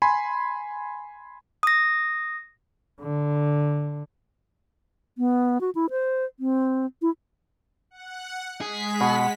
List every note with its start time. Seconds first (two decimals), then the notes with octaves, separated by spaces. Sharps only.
0.02 G#5 B5 C6
1.63 D#6 A#6
3.01 D3
5.18 B3
5.61 F#4
5.75 E4
5.90 C5
6.40 C4
7.02 E4
7.91 F#5
8.61 G#3 G#4 B6
9.01 B2 F#5